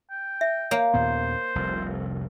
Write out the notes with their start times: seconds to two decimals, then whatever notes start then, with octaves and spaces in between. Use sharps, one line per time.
0.11 G5
0.41 E5
0.71 A#3 C#5
0.94 D#2 A#2 B3 C5
1.55 F1 C2 F2